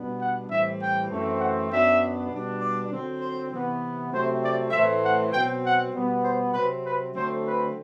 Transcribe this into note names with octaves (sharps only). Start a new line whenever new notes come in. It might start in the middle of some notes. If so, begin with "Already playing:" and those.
Already playing: B2 G3 B3 D4
F#5
A2 E3 G3 C4 E5
G5
F#2 E3 A3 C4
F#5
F#2 F#3 B3 D4 E5
B2 G3 D4
D5
D3 F#3 C4
C5
C3 E3 B3
C3 F#3 A3 C4 C5
D5
A2 E3 A3 C4 E5
F#5
B2 F#3 C4 G5
F#5
B2 G3 B3
C5
C3 F#3 C4 B4
B4
D3 F#3 A3 C4 C5
B4